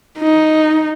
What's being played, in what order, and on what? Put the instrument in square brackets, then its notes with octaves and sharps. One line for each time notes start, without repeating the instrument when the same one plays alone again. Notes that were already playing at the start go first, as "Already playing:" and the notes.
[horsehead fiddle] D#4